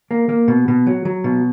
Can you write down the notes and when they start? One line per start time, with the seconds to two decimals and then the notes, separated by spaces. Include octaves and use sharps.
0.11 A#3
0.29 A#3
0.48 B2
0.68 B2
0.87 F#3
1.05 F#3
1.24 B2